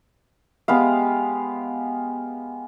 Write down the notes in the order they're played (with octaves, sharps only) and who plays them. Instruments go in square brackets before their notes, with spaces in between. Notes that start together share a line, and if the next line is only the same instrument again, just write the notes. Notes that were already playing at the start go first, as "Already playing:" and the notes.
[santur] G#3 B3 G4 F5